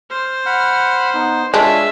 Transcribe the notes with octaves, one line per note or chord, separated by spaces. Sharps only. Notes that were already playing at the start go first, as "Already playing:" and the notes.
C5 F6
F#5 B5 F6
B3 D#4
G#3 D4 F4 C#5 E5